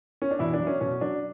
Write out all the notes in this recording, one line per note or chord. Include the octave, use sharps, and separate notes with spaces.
C#4
D4
B2 E3 E4
D4
F#3
C#4
B2 C#4
F#3 D4